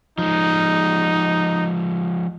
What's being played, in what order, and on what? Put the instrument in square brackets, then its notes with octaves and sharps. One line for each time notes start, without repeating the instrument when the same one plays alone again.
[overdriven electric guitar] F3 G#3 [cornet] D#4